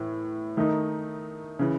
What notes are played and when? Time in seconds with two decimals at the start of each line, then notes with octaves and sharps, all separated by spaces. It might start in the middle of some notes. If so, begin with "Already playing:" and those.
Already playing: A2 E3
0.57 D#3 A3 D#4
1.59 C#3 E3